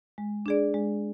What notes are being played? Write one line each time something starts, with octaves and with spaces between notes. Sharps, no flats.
G#3
D4 G#4 D5
G#3